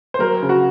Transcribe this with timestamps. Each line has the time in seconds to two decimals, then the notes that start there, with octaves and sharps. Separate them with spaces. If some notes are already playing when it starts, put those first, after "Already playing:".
0.14 C5
0.19 F#3 A#4
0.42 C#3
0.49 F#4